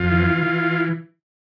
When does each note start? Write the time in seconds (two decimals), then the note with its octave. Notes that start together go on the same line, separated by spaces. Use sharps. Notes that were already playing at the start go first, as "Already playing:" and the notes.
Already playing: F2 F4
0.11 E3
0.43 E3